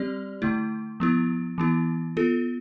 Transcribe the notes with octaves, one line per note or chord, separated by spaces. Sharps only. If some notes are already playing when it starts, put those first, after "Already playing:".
Already playing: G3 C4 G4 D5
D3 A3 E4
F3 B3 E4
E3 B3 E4
B3 F4 A4